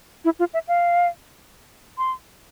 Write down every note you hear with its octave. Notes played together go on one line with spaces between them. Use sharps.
E4
F4
E5
F5
C6